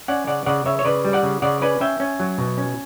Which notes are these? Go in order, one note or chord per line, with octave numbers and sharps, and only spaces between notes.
C#4 D5 F#5
C#3 D5 F#5
C#3 D5 F#5
C#3 C#5 E5
C#5
C#3 B4 D5
G3
D5 F#5
C#3
C#3 D5 F#5
C#4 B4 D5
C#4 E5 G5
C#4
F#3
B2
C#4